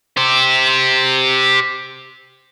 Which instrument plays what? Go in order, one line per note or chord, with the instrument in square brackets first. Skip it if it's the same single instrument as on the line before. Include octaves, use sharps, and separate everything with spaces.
[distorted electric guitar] G4 C5